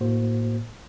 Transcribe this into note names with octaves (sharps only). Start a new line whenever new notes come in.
A2 A#3 F#4 C5